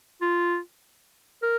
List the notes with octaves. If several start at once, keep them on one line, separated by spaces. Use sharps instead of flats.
F4
A#4